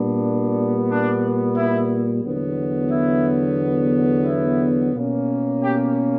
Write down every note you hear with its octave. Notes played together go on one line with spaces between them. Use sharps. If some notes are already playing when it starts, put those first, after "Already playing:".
Already playing: A#2 G3 B3 D4
D4
E4
E2 D3 F#3 B3
E4
E4
B2 A#3 C#4
G4